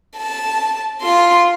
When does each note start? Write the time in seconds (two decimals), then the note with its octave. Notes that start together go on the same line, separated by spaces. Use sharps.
0.17 A5
1.02 F4 C6